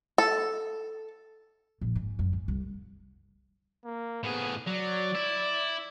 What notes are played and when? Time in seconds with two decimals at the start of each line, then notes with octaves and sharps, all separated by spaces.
0.18 A4
1.81 A#1
1.95 G#2
2.19 F#2
2.33 G#2
2.48 C2
3.85 A#3
4.24 A2 B3 G#4
4.67 F#3 D5
5.15 E4